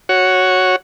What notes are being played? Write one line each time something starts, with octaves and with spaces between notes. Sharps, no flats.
F#4 C#5